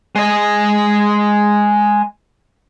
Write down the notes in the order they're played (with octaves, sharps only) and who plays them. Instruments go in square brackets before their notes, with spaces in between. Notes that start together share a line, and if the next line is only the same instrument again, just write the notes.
[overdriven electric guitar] G#3 D#5